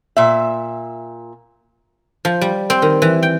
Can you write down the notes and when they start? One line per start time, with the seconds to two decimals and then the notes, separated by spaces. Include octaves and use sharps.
0.17 A#2 E5
2.25 F3
2.41 G3
2.70 C4
2.82 D#3
3.02 E3
3.23 G5